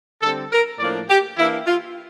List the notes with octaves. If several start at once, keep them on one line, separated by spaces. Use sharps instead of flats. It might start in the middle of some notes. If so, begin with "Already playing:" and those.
D3 G3 C4 A4
A#4
A2 F3 A#3 D4 D5
G4
E3 A#3 D4 E4
F4